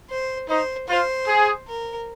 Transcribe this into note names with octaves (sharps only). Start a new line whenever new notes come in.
C5
D#4 C5
F4 C5
G#4
A#4